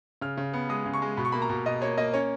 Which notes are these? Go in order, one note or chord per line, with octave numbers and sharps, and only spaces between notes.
C#3 F6
C#3
B3
G#3 D#6
C#3
C#6
G#3
B2 B5
C#6
A#3 B5
A#5
B2
B2 D#5
A#3 C#5
A#3 D#5
C#4 C#5